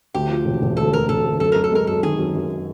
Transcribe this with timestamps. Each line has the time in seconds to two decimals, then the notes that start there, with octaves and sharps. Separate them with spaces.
0.14 D2 G4
0.29 F3
0.45 E1
0.62 E1
0.77 D2 A4
0.92 D2 A#4
1.09 E1 A4
1.24 D2
1.40 F#2 A4
1.52 F#2 A#4
1.64 A4
1.72 G#3 A#4
1.87 F#2 A4
2.03 D#3 G#4
2.19 F#2
2.35 F#2